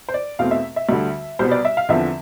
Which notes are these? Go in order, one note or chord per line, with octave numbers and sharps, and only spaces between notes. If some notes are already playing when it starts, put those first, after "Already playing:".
C5
D5
E2 B2 A3 C4 F5
E5
E5
D2 D3 G3
C2 B2 G3 B3 C5
D5
E5
F5
E2 D3 F3 C4 E5